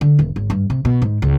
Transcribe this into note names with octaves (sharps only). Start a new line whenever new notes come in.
D3
D#1
G#1
G2
C3
B2
G#2
C#2